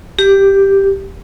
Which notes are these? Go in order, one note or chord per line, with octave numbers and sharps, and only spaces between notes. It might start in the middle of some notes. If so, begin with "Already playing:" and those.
G4